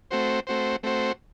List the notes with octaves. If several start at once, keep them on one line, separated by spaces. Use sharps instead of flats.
A3 C4 F#4 C5
A3 C4 F#4 C5
A3 C4 F#4 C5